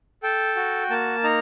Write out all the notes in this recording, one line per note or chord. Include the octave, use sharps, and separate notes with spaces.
A4 G5
F#4
A#3 A5
D#4 A#5